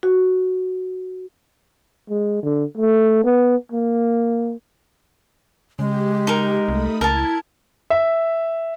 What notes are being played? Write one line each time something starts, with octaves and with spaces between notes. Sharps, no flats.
F#4
G#3
D3
A3
B3
A#3
C#3 G#3 G4
D#4 A#4
C2 A3 B5 D#6
C#2 E4 A#4 A5 G#6
E5